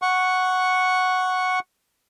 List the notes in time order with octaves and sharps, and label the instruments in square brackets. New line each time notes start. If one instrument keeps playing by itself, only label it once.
[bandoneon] F#5 C#6